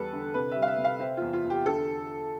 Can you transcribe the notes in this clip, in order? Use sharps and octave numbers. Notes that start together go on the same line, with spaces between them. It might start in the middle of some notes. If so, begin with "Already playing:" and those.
Already playing: E2 G3 A4 B4
D3
C3 B4
G3 E5
F5
E5
C3
F5
C4 E5
E2 F4
F4
E2
G4
D3 A4